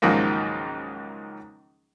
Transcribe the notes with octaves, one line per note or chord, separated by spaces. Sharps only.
C#2 G#2 D#3 F3 F#3 A#3